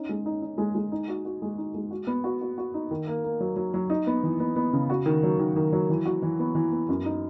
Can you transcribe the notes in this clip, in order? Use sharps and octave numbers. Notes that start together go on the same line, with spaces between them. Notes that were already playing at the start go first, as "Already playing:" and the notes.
Already playing: C#4 D#4
G#3
D#4
D#4
G#3
G#3
D#4
F#4
F#4
G#3
D#4
G#3
F#4
B3
F#4
F#4
F#4
D#4
D#3
A#3
A#3
F#3
F#3
F#3
D#4
B3
E3
B3
B3
C#3
F#4
D#3
F#3
D#3
D#3
F#3
E3
F#4
E3
B3
E3
B3
F#2
D#4